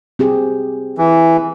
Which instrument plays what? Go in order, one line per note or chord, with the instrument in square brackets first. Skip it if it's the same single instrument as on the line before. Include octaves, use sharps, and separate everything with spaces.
[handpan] C4 G4 G#4
[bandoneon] E3